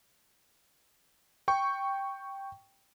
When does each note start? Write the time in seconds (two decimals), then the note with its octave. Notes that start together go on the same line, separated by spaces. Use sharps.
1.48 G5 C#6